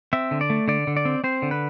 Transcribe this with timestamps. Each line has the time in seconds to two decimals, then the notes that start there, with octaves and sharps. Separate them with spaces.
0.13 C4 E5
0.31 D3
0.41 D5
0.50 A3
0.68 D3 D5
0.87 D3
0.97 D5
1.05 C4
1.24 C4 C5
1.42 D3
1.51 B4